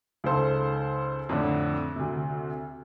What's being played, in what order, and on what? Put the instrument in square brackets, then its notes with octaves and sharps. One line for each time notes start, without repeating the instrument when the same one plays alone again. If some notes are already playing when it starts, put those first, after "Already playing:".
[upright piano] C#2 D#4 A4 C5
F2 A2 D3
D2 C3